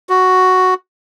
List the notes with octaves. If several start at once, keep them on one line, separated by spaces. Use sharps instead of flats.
F#4